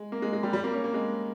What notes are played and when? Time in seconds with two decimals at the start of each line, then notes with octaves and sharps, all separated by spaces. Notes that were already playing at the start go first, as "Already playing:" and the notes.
Already playing: G#3
0.12 A#3
0.22 G#3
0.33 G#3
0.43 G3
0.53 G3
0.64 A#3
0.74 C#4
0.84 A#3
0.94 G#3